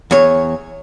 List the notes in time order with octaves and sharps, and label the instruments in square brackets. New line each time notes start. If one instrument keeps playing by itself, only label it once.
[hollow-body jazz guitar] E2 C#5